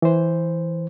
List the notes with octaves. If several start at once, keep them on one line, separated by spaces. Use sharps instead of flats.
E3 C5